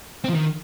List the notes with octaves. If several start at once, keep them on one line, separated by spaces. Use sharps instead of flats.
C4
F3
D#3